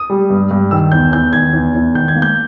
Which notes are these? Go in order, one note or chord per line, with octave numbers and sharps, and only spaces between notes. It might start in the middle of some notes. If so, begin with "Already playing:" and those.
Already playing: D#6
G3
G2
G2
D#3 E6
E2 G6
E2 G6
D#3 G#6
E2
E2
D#3 G6
G#6
A#3
G6